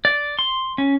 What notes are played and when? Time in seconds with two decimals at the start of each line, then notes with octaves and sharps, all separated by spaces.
0.05 D5
0.39 C6
0.78 C#4